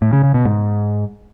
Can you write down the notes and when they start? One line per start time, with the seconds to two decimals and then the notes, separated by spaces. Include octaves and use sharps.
0.02 A2
0.13 C#3
0.23 C#3
0.34 B2
0.45 G#2